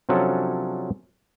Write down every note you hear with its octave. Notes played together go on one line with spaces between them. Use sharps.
C3 F3 F#3 C#4 D4 A4